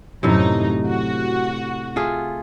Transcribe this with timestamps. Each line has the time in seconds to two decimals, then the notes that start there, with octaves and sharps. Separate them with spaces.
0.23 F#2 A2 C3 D#4
0.88 F#4
1.96 A3 F4 G#4